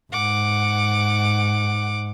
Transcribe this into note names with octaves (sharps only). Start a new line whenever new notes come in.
G#2 F#5 D6